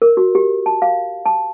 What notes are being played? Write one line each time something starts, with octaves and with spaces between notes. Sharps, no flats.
A#4
F#4
G4
A5
F5
A5